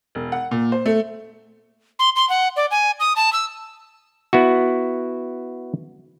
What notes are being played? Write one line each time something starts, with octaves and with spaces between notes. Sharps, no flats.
E1
F#5
A#2
C5
A3
C6
C6
F#5
D5
G#5
D#6
A5
E6
B3 E4 F#4